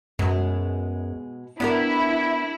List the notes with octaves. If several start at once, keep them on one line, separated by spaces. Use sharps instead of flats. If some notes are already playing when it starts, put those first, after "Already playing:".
F#2 B2 G#3
B3 D4 E4 G4 A#4